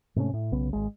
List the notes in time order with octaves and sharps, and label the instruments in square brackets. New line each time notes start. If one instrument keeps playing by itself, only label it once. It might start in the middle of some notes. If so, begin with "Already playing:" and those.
[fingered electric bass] G#2 C3 A3 C#4
A2
B1 C#3 B3
G#1 G#3